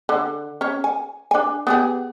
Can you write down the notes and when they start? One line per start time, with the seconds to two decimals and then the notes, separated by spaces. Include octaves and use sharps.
0.09 D3
0.61 C#4 C#5
0.84 G#5
1.31 D4 G#5
1.67 B3 G4 G#4